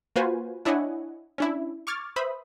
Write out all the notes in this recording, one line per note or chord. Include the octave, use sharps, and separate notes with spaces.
A#3 F4 F#4 B4 C5 G#5
D4 E4 C#5 D#5 F#5 G#5
C#4 D4 E4
C#6 D6 F6 G#6 A6
B4 C5 E5 B5 D#6